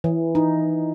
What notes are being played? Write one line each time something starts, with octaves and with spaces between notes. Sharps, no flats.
E3
D#4